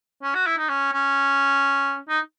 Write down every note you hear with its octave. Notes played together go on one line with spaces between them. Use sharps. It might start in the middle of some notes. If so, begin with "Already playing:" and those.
C#4
F#4
E4
D#4
C#4
C#4
D#4